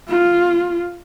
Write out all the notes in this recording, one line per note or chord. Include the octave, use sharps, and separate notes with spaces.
F4